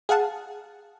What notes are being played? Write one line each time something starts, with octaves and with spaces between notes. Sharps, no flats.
G#4 F5 F#5 A5